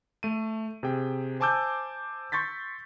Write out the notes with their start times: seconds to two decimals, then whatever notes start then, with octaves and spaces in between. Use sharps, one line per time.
0.23 A3 D#7
0.83 C3 G#4 G5
1.40 C5 G#5 A5 D6 E6 G6
2.32 C6 C#6 G6 A6 B6